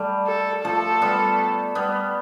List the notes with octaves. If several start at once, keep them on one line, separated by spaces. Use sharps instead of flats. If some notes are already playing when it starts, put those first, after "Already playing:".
Already playing: G3 A3
A4
F3 A3 A4
G3 B3
G3 B3